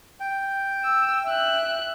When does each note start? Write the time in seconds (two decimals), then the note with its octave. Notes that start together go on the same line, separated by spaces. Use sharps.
0.20 G5
0.84 E6
1.25 E5 F#6